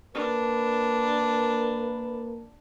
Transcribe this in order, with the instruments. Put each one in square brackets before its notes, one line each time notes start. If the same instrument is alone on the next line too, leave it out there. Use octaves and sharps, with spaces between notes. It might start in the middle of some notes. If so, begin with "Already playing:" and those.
[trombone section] A#3 A#4 B4 [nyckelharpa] D4